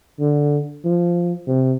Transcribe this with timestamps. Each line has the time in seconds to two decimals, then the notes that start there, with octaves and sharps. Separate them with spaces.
0.20 D3
0.84 F3
1.47 C3